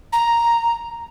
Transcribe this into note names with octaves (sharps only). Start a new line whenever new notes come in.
A#5